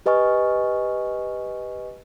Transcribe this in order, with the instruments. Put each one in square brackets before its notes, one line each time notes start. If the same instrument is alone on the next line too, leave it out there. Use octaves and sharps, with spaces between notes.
[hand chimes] G4 B4 D#5 G#5 C#6 F6